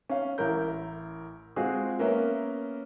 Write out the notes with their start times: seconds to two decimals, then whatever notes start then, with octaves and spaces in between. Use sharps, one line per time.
0.10 C#4 F5
0.38 A1 E4 A#4 G6
1.56 G#3 C4 F4 F#4 G#4
1.99 A#3 B3 C#4 A#4 E5